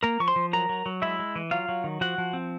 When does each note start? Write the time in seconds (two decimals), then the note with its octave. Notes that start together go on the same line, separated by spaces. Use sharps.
0.03 A#3 A#4 A#5
0.20 F3 C#6
0.28 C5 C6
0.36 F3
0.53 F#3 A#4 A#5
0.69 F#3
0.86 F#3
1.02 G#3 E4 E5
1.19 G#3
1.36 E3
1.51 F#3 F4 F5
1.69 F#3
1.84 D#3
2.01 F3 F#4 F#5
2.18 F3
2.33 C4